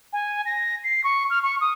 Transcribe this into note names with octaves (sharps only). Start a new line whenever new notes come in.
G#5
A#6
C7
C#6
F6
C#6
D#6